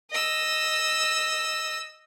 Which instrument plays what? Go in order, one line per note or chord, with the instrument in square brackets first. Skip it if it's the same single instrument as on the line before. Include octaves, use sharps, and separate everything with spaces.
[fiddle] D#5 E6